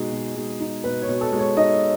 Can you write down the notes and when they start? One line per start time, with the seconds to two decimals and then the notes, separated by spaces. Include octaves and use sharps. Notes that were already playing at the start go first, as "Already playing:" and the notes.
Already playing: B2 G#3 D#4 G#4
0.12 B2
0.36 G#3
0.60 D#4
0.84 B2 B4
1.02 C#5
1.09 B2
1.21 A4
1.32 G#3
1.39 C#5
1.57 D#4 D#5